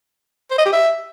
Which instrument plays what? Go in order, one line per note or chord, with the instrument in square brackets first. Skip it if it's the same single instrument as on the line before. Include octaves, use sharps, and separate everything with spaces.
[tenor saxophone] C5
D#5
G4
E5